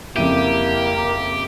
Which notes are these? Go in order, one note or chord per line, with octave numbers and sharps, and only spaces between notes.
F2 C#3 A#3 E4 G4 D#7